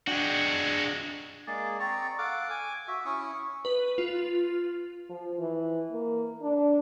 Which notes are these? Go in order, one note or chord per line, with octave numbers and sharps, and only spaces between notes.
G#3 D4 F#4 G5
G#3 A#3 G#4 D5
C4 D5 A#5 C#6
A4 F5 F#5 D6
G#5 D6
F#4 E5
C#4 E4 C#6 D#6
B4
F4
F3
E3
A#3
D4